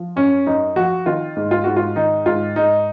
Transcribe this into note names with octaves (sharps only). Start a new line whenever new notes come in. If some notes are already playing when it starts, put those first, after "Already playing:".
Already playing: F3
F#2 C#4
F#2 D#4
F3 F#4
D#3 F4
G#2
F4
G#2 F#4
F4
D#3 D#4
G#2 F4
G#2 D#4